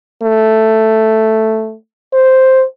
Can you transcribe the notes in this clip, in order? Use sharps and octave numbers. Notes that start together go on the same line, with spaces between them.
A3
C5